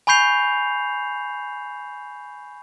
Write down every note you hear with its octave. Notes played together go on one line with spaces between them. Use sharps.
G#5 B5 C#6 G6 C7 F7